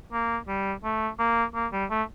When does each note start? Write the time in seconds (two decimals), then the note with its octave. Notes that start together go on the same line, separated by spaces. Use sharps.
0.13 A#3
0.48 G3
0.84 A3
1.19 A#3
1.55 A#3
1.72 G3
1.90 A3